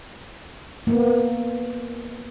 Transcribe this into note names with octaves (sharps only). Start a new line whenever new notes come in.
A#3 B3